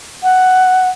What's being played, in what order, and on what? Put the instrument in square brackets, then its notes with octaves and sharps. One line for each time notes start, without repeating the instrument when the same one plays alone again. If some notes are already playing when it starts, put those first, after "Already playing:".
[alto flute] F#5